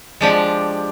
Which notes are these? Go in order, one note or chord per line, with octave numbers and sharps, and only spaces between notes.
F3 G#3 D4 G4